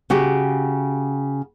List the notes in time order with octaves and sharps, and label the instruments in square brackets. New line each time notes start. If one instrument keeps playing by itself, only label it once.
[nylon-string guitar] C#3 F#4 G4